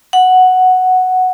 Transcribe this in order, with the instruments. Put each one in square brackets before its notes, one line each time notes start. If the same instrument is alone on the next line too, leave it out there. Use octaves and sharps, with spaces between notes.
[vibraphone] F#5